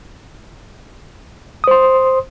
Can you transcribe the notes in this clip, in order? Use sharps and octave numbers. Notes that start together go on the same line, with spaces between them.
C5 C6 D#6